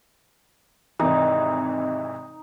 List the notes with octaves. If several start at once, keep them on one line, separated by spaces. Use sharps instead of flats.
G#1 C3 E3 D#4